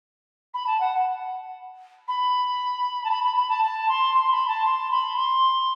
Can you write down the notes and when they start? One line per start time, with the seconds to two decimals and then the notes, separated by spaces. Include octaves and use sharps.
0.54 B5
0.66 A5
0.80 F#5
2.08 B5
3.04 A5
3.10 B5
3.24 B5
3.36 B5
3.49 A5
3.62 A5
3.88 C6
4.14 C6
4.31 B5
4.47 A5
4.65 C6
4.91 B5
5.16 C6